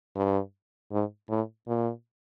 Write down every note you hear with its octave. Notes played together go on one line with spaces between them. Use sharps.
G2
G#2
A2
A#2